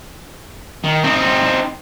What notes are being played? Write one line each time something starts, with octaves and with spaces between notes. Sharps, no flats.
D#3
C4 D#4